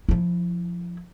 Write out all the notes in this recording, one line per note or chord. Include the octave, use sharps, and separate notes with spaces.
F3 E4